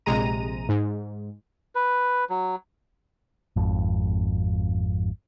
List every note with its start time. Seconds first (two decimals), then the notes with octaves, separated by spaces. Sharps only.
0.06 A#1 C3 G#3 A#5 D#7
0.69 G#2
1.75 B4
2.30 F#3
3.56 G#1 F2